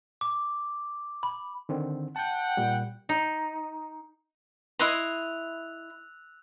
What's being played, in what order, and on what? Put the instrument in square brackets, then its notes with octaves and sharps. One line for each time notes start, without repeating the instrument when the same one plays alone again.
[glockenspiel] D6
B5
[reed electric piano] D3 D#3 C4
[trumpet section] F#5 G5 [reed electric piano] A5 G6
[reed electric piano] A#2 G3
[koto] D#4
[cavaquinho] E4 D#5 C6 [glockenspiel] E6 F#6 F7